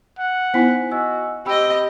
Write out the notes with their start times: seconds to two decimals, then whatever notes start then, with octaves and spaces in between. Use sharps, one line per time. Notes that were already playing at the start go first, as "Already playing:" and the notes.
0.19 F#5
0.54 B3 D#4 E4 C5 G#5 B6
0.92 F#4 D#5 G#5 E6
1.46 C4 G4 D#5 G5 B5 E6